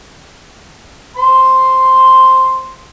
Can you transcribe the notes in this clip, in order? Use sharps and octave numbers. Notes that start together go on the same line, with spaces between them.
C5 C6